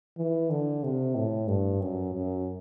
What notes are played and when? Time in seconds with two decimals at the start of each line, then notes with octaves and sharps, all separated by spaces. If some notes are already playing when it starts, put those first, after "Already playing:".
0.17 E3
0.50 D3
0.84 C3
1.15 A2
1.48 G2
1.81 F#2
2.14 F#2